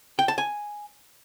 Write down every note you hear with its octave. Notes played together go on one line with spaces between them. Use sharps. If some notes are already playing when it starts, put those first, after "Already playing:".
G5
A5
G#5